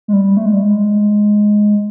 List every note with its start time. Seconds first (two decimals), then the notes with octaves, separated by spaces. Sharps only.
0.08 G#3
0.13 G3
0.37 A3
0.46 G#3
0.53 G3
0.62 G#3